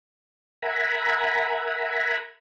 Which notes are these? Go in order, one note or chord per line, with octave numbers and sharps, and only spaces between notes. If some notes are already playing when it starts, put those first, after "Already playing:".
A#4 E5 F#5 G#5 A#5 B5